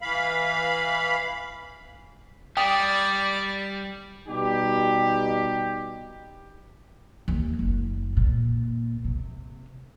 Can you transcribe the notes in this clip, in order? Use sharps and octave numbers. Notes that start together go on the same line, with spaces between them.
E3 F5 B5
G3 D5 G5 D#6
B2 G3 D#4 G4
D#2
F#1
A#2
C3